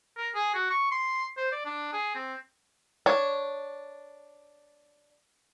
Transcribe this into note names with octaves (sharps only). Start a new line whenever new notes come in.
A#4
G#4
F#4
C#6
C6
C5
D5
D4
G#4
C4
D4 C#5